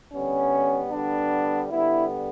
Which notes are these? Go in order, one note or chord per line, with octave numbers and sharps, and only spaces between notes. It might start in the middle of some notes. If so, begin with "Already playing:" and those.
D3 G3 B3 C#4
D3 G3 B3 D4
D3 G3 B3 E4